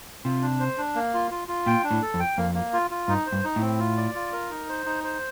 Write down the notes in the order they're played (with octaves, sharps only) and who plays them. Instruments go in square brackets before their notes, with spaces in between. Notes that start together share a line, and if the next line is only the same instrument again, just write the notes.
[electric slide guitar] C3 [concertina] F4
[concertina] D4
C5
D4
A#3
F4
F4
F4
[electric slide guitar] A#2 [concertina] G5
[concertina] D4
[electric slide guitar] A2
[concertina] A4
[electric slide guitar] F2
[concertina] G5
[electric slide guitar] F2 [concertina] A#3
[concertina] A#3
F4
F4
[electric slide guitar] G2 [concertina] D#4
[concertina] C5
[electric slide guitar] G2
[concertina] D#4
[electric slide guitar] A2
[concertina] C4
F4
D5
F4
A#4
D#4
C5
D#4
C5